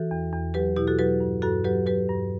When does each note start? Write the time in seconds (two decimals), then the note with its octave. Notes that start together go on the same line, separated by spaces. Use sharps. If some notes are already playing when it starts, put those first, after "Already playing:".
Already playing: E3 F#4 A4
0.11 E2
0.33 E2
0.54 F#3 G4 B4
0.76 B2 E4 G4
0.87 F#4 A4
0.99 F#3 G4 B4
1.20 G2
1.42 G2 F#4 A4
1.64 F#3 G4 B4
1.86 F#3 G4 B4
2.09 G2